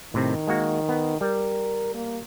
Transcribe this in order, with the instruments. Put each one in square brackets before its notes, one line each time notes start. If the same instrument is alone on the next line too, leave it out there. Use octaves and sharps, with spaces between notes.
[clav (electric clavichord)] A2 C3 C4 [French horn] D#3
[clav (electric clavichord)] G#3 A#3 F#4
B3
[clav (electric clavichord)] G3 [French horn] A#4
[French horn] A#3